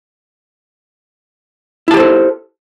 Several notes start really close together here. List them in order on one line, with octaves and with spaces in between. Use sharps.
E4 A5 G4 C5 A4